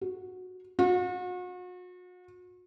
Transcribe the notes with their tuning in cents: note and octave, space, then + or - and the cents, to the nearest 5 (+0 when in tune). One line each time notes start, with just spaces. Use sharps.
F#4 -10
F#4 -40